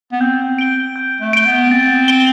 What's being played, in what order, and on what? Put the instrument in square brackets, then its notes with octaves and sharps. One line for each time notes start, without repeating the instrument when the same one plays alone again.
[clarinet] B3
[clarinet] C4 [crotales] G6
[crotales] D7 G7
G6
[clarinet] A3
[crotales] D7 G7
[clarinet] B3
[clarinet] C4 [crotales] A6
[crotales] D7 G7